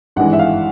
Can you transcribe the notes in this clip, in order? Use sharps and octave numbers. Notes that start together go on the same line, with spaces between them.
G#1 G2 E3 G#3 F#5
E5
F5